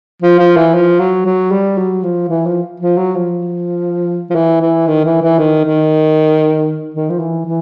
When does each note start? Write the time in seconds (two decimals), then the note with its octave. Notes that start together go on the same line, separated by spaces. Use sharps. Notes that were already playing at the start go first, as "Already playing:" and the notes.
0.22 F3
0.39 F3
0.56 E3
0.74 F3
0.99 F#3
1.25 F#3
1.51 G3
1.78 F#3
2.03 F3
2.29 E3
2.46 F3
2.80 F3
2.97 F#3
3.15 F3
4.30 F3
4.35 E3
4.61 E3
4.87 D#3
5.04 E3
5.22 E3
5.39 D#3
5.65 D#3
6.94 D#3
7.10 F3
7.19 E3
7.46 E3